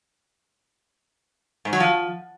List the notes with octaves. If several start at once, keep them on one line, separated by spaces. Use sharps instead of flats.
G#2
F#3
F3